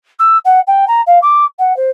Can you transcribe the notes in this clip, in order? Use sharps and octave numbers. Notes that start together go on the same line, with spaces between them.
E6
F#5
G5
A#5
F5
D6
F#5
C5